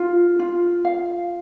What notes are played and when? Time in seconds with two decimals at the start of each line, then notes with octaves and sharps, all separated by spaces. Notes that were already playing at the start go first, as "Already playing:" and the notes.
Already playing: F4
0.39 F4
0.85 F5